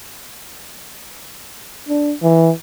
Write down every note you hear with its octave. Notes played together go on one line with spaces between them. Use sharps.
D4
E3